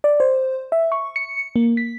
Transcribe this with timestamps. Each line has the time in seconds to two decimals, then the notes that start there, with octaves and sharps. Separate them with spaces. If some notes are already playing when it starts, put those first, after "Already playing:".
0.04 D5
0.20 C5
0.72 E5
0.92 C#6
1.16 C#7
1.56 A#3
1.77 B6